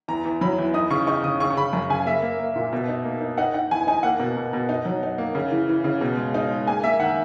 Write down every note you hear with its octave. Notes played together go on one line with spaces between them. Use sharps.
E2 A#5
E2
F#3 B5
E2
D#4 D#6
C#3 C#6
D#4 C#6
C#3 D#6
C#3 C#6
C#6
C#3 B5
F#2 A#5
C#3 G#5
A#3 E5
A#3
A#3
A#2
B2
D#4
A#3
D#4
D#4 F#5
D#4 F#5
E2 G#5
D#4 G#5
A#3 F#5
B2
B2
B2
D#4
F#3
D#4
A#3
C#3
E3
E3
C#3
B2
G#3
D#4
G#3
A#3 G#5
A#3 E5
D#3 F#5